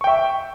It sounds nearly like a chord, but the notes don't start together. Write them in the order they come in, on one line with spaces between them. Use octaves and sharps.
C#6 G5 E5